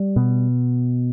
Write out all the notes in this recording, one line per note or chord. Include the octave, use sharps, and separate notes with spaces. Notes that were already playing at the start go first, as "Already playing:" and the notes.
Already playing: G3
B2